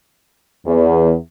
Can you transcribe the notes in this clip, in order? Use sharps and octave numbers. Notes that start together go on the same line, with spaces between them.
E2